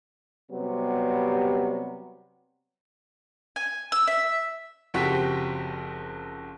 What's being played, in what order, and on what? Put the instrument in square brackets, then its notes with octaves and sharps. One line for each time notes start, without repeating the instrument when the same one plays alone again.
[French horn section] C3 F#3 G3 B3
[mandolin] G#5
E6
E5
[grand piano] F#1 F3 C4 F#4 G4 B6